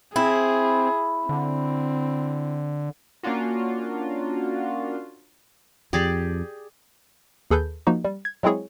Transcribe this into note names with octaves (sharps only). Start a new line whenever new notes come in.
C4 E4 G#4
D3 C4
A#3 C#4 D4 F4 F#4
F2 G4 G#4 D5
D#2 G#4 A4 B4 G6
F3 A#3 D#4 F#4
G3
G#6
F#3 G#3 C4 E4 G#4 C#5